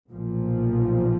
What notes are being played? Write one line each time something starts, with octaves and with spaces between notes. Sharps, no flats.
B1 A#2 F3